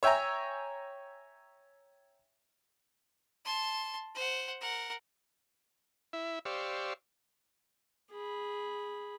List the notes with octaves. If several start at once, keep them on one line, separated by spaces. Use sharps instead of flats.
C#5 E5 G5 G#5 A#5
A5 C6
C5 F#5
A#4 F#5
E4 E5
G4 C5 D5 F5 C#6 E6
G#4 B5